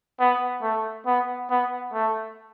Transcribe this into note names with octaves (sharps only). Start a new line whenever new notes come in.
B3
A3
B3
B3
A3